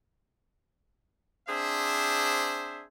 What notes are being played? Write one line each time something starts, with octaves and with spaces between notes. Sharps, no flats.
C4 D4 G#4 C5 E5